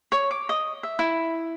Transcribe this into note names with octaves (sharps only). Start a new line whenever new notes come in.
C#5
D6
D#5
E5
E4